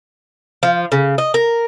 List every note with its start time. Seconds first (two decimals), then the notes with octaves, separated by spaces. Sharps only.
0.63 F3
0.92 C#3
1.18 D#5
1.34 A#4